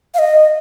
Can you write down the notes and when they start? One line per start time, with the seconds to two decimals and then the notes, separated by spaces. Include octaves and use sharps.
0.14 F5
0.19 D#5